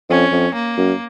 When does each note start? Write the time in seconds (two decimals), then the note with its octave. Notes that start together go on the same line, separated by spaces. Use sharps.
0.09 F2 C#4
0.32 F2
0.54 A#3
0.77 F#2